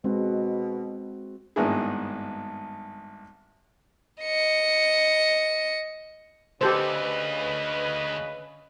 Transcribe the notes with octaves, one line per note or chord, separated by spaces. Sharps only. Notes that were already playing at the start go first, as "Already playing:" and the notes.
B2 G#3 C4 F#4
G#1 G2 A#3 B3 E4 G#4
D#5 C#7
D2 C#3 G4 A4 B4 C5 D#5